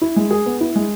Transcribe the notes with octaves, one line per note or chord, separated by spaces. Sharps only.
E4
G#3
G#4
B3
E4
G#3